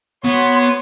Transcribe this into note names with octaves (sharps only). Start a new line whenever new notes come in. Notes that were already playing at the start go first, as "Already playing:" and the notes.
B3 F#4 C#5 C6